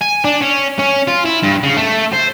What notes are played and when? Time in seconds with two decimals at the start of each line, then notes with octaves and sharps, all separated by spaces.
0.01 G#5
0.24 D4
0.42 C#4
0.79 C#4
1.07 F4
1.26 E4
1.43 G2
1.63 C#3
1.76 A3
2.13 C5